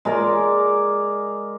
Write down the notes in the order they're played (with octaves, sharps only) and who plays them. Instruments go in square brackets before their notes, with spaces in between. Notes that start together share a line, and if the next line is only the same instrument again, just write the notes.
[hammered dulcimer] G#3 A#4 D5 D6